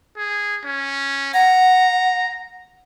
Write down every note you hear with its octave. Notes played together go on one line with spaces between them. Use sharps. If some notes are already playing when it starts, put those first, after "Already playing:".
G#4
C#4
F#5 A#5